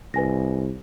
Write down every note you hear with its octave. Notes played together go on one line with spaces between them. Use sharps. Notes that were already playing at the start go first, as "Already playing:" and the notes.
C2 B4 G#5 A#6